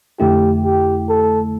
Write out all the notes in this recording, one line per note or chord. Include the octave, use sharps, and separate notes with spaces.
F2 D3 A3 E4 G4
G4
A4